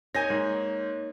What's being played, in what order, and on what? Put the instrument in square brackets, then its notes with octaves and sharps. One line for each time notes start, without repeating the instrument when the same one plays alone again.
[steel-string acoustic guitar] A#3 D#4 C#5 [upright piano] G#5 G6 A#6
[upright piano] G#2